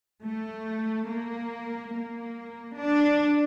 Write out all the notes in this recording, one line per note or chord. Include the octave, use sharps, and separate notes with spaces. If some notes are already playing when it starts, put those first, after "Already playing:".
A3
A#3
A#3
D4